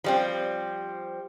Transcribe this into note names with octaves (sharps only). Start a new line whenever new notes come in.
F3 G3 C4